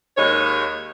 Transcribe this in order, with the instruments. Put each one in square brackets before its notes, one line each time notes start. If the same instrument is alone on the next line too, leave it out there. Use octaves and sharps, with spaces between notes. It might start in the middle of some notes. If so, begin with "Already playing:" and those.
[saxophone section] D#2 G#3 D#4 C#5